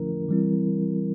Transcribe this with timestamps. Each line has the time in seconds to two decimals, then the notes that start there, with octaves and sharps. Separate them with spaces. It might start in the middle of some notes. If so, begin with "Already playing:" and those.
Already playing: D3 F3 A3 C#4 E4 A#4
0.29 E3 G3 C4 E4